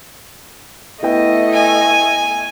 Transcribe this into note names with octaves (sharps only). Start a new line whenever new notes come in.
A3 B3 E4 D#5 G5
G#5